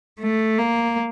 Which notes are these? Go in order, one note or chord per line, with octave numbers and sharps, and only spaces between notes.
A3
A#3